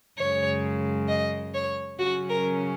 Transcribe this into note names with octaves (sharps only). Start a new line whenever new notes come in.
F#2 C#3 G#3 C#5
D#5
C#5
C#3 F#3 C#4 F#4
A#4